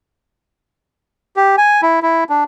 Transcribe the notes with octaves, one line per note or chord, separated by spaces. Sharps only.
G4
G#5
E4
E4
D4